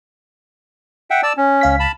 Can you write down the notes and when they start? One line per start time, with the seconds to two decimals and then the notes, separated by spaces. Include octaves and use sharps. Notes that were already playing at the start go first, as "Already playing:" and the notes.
1.10 E5 F#5 G5
1.23 D5 A5 E6
1.37 C#4
1.61 C#2 F5 B6
1.80 A5 B5